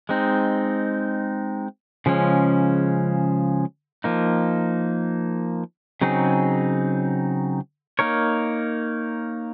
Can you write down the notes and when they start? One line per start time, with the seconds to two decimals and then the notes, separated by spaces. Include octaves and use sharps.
0.09 G#3 C4 D#4
2.06 C#3 F3 G#3 C#4
4.04 F3 A#3 D#4
6.02 C#3 F#3 C4 D#4 G#4
7.99 A#3 D#4 A#4 C#5